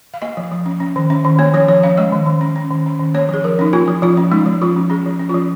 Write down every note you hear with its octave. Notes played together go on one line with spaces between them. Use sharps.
F5
A#3 D#5
F3
F3
C#4
C#4
D#3
C#4
D#3
A#3 C#5
F3 C#5
F3 C#5
C#4 F5
G#3 D#5
D#3
D#3
C#4
C#4
D#3
C#4
D#3
A#3 C#5
F3 G#4
F3 A#4
C#4 D#4
A#3 F4
F3
F3 F4
C#4
G#3 D#4
F3
F3 F4
C#4
C#4 G#4
F3
C#4
F3 F4